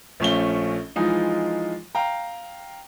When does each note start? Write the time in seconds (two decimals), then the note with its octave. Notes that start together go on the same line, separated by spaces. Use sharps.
0.20 A#1 F3 A3 C#4 F5 G7
0.96 E3 F3 G#3 D#4 F4
1.95 F5 G5 A#5